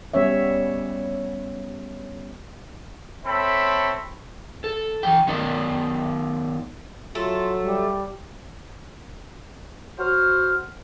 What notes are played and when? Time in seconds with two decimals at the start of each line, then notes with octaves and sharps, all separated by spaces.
0.14 G3 B3 C#4 C#5 E5
3.25 C4 A4 C#5 E5 B5
4.64 A4
5.03 E3 G3 G5
5.27 D#3 B3 D#4 A#4 D5 D#5
7.15 F#3 A3 F4 A4
7.63 G3
9.99 F#4 C5 F6